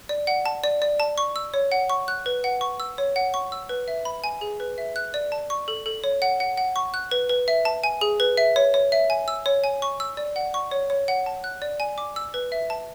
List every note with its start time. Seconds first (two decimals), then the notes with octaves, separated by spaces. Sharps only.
0.09 D5
0.27 F#5
0.46 A5
0.64 D5
0.82 D5
1.00 A5
1.18 C#6
1.36 E6
1.54 C#5
1.72 F#5
1.89 C#6
2.08 F#6
2.26 B4
2.44 F#5
2.61 C#6
2.80 E6
2.98 C#5
3.16 F#5
3.34 C#6
3.52 E6
3.69 B4
3.88 E5
4.05 B5
4.24 G#5
4.41 G#4
4.60 B4
4.78 E5
4.96 F#6
5.14 D5
5.32 A5
5.50 C#6
5.68 A4
5.86 A4
6.04 C#5
6.22 F#5
6.40 F#5
6.58 F#5
6.76 C#6
6.94 F#6
7.11 B4
7.29 B4
7.48 E5
7.65 A5
7.84 G#5
8.01 G#4
8.20 B4
8.37 E5
8.56 C#5
8.74 C#5
8.92 E5
9.10 G#5
9.28 E6
9.46 C#5
9.64 G#5
9.82 C#6
10.00 E6
10.17 D5
10.36 F#5
10.54 C#6
10.71 C#5
10.90 C#5
11.08 F#5
11.26 A5
11.44 F#6
11.62 D5
11.80 G#5
11.98 D6
12.16 E6
12.34 B4
12.52 E5
12.70 A5